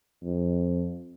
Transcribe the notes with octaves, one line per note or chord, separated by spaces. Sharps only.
F2